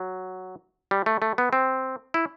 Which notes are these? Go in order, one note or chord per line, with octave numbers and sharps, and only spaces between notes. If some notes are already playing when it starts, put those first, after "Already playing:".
Already playing: F#3
G3
A3
A3
B3
C4
E4